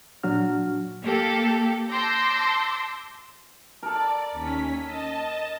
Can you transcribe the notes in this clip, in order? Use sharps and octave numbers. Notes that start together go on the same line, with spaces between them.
A#2 F#3 D4 F#4 F6
A#3 G4 A4
A5 C6 D6 E6 G6 A#6
A4 A#4 D5
D#2 C#4 B6
D#5 A5